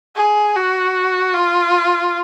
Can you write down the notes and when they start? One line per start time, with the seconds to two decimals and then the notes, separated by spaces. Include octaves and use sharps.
0.16 G#4
0.55 F#4
1.34 F4